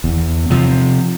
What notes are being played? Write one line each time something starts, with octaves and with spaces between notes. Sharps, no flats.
E2
C3 F3